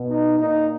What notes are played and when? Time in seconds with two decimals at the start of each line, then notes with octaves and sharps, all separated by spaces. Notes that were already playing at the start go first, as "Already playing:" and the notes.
Already playing: B2
0.08 D#4
0.38 A#2 D#4